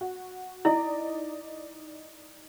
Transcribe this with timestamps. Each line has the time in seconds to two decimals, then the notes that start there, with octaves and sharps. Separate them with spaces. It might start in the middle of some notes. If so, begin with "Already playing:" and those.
0.01 F#4
0.65 D#4 E4 D5 D#5